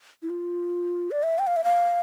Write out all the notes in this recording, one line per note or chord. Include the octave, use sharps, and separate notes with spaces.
E4
F4
D5
E5
G5
F5
E5
F5